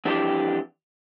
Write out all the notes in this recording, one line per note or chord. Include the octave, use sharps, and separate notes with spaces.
F2 E3 G3 D4 G4